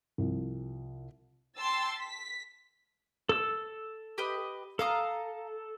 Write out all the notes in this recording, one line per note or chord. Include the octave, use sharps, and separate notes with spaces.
C2 F3
G5 A5 C6 E6 A6
B6
A4 E6
G4 B4 D#5
A4 F5 A#5 D#6